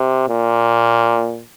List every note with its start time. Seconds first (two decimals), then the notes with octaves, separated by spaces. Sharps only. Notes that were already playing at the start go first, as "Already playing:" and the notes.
Already playing: C3
0.29 A#2